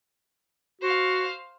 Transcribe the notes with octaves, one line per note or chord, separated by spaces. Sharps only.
F#4 C5 F5